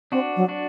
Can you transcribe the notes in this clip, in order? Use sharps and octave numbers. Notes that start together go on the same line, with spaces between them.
C4 D4 F#4
F#3
D4 F#4